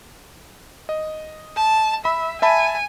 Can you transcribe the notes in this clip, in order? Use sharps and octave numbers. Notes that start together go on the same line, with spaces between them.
D#5
A5
E5 B5
E5 G#5 A5 B5